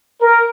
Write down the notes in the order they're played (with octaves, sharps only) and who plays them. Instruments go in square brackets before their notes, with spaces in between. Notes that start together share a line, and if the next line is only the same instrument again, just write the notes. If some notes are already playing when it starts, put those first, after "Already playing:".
[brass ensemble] A#4